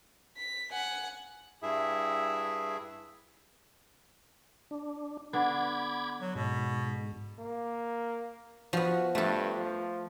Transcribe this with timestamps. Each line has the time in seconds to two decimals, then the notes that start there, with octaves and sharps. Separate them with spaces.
0.37 B6
0.72 F#5 G#5
1.63 G2 E4 G#4 E5
4.71 D4
5.33 D3 B3 D4 B5 D6 G#6
6.21 F#3
6.35 G#2 B2
7.39 A#3
8.73 F3 B3 F#4
9.15 G2 A3 A4
9.57 F3